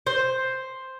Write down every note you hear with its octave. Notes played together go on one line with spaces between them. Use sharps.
C5